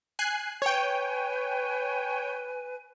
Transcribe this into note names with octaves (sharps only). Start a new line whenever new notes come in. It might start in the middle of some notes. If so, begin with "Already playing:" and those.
G#5 F#6 C7
B4 C#5 G5 G#5